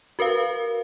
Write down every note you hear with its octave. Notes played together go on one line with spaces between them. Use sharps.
F#4 A#4 B4 F5